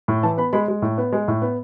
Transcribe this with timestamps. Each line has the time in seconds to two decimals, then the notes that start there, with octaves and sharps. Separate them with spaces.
0.08 A2
0.23 E3 A5
0.38 B3 B5
0.53 G#3 B5
0.68 G#3
0.82 A2
0.98 B3
1.13 G#3
1.28 A2
1.42 B3